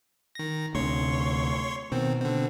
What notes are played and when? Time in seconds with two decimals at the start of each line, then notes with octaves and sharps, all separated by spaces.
0.35 D#3 A#6
0.75 D2 C3 C#5 C6 C#6
1.92 B2 D#3 C4
2.21 D3 C4